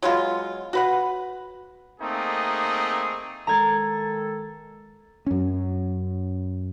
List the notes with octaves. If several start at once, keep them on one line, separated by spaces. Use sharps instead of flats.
F#3 G#3 B3 F4
F#4 B4 F#5
A3 A#3 C4 D#4 G#4
D#3 G#3 A4 A#5 G#6
F#2 C#4